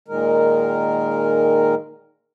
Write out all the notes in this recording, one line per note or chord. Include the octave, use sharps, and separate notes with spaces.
A#2 D#3 G#3 A#4